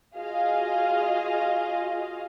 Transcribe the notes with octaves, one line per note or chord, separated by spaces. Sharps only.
F4 F#4 G#4 D#5 F5